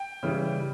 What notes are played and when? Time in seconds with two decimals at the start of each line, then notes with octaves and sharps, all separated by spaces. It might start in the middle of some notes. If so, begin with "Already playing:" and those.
Already playing: G5
0.23 C#3 E3 G3